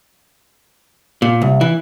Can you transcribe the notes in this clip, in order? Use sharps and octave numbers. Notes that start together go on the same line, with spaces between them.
A#2
C2
E3